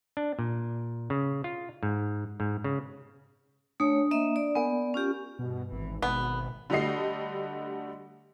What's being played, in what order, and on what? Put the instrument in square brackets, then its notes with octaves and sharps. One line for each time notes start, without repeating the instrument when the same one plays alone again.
[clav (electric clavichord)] D4
A#2
C#3
F4
G#2
G#2
C#3
[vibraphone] A3 C#5 [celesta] D4 D#6
[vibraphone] A#3 D#5 E5
D5
[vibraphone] B3 D5 [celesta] A#4 F#5 G#5
[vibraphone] C#4 F4 G4
[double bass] G2 [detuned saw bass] B2
[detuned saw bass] G#1 [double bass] E3
[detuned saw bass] G#1 [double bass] B2 [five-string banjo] B3
[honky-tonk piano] D3 G3 A3 F#4 D#5 C7